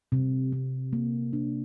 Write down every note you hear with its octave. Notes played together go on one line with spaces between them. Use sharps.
C3
C3
A#3
D4